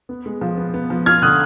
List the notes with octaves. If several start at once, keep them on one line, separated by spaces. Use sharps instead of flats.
B3
G#3
F3
B3
B3
F3
F4 F6 G#6
D3 D#6 F#6